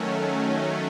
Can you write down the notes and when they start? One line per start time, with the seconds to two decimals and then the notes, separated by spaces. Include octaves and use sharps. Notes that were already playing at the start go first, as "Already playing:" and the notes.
Already playing: D#3 F#3 A3 C#4